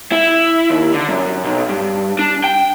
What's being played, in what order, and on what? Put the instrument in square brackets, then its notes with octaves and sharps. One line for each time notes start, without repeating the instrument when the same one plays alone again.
[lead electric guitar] E4
D#2
D3
F#2
B1
G2
D4
G5